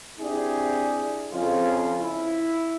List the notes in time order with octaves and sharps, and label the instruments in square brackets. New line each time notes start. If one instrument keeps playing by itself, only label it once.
[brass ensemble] C4 D4 E4 G4 G#4
F2 C#3 F4
E4